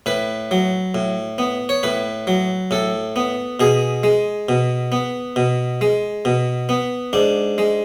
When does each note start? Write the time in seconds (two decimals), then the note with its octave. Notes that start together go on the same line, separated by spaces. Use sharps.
0.06 A2 B4
0.51 F#3
0.95 A2
1.38 B3
1.69 C#5
1.83 A2 B4
2.27 F#3
2.71 A2 A4
3.16 B3
3.60 B2 G#4
4.03 G#3
4.49 B2
4.92 B3
5.36 B2
5.81 G#3
6.25 B2
6.69 B3
7.13 G#2 D4
7.58 G#3